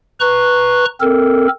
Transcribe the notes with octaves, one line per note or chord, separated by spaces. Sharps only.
B4 A#5 C#6 F#6
C4 A4 A#4